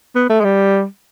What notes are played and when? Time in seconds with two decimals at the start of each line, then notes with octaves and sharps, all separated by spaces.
0.15 B3
0.30 A3
0.40 G#3
0.44 G3